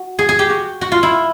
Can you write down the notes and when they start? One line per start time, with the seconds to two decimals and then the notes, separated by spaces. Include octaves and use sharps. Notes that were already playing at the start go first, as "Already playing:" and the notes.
Already playing: F#4
0.19 G#4
0.29 G#4
0.39 G4
0.50 F#4
0.81 F#4
0.92 F4
1.03 E4